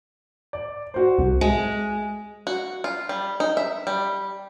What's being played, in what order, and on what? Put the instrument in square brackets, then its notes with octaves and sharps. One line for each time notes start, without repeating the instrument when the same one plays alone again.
[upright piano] D5
F#4 C5
[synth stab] C2
[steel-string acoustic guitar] G#3
[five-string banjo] F#4
F4
G3
D#4
E5
G3